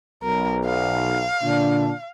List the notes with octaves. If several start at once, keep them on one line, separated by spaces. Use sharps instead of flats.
B1 A#4
F5
A#2 D3 D4